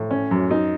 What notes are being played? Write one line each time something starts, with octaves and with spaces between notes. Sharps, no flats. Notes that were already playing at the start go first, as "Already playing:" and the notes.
Already playing: A2
C#4
F#2
D#4